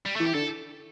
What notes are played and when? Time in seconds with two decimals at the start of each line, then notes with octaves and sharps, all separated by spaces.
0.06 G3
0.16 A3
0.20 E3 G4
0.35 D3 A4